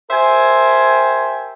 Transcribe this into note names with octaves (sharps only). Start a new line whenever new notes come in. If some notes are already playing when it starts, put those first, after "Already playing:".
G4 A#4 C5 E5 G5 G#5